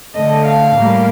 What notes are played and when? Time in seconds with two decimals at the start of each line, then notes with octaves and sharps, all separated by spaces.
0.16 D3 A3 D#5
0.46 F5
0.75 A2 G3 A#3